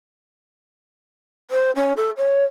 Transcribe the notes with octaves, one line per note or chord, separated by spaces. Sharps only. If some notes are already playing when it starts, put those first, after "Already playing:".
C5
C#4
A4
C#5